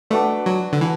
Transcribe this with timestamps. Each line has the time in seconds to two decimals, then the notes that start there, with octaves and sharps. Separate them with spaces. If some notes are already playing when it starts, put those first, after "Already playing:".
0.10 A3 D4 F#4 B4 D5
0.46 F#3
0.73 D3
0.81 E3